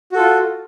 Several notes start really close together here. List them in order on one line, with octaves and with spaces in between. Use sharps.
F#4 A4 F4